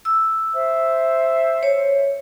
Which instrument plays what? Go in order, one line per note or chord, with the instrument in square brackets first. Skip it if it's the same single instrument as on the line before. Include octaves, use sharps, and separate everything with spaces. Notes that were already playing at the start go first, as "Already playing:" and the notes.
[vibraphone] E6
[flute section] C5 E5
[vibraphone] C#5